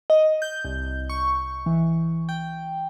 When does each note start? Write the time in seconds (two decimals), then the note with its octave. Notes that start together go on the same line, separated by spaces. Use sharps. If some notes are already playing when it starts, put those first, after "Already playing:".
0.10 D#5
0.42 G6
0.65 C2
1.09 C#6
1.66 E3
2.29 G5